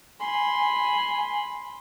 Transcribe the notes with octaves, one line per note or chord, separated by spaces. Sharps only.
G#5 B5 C6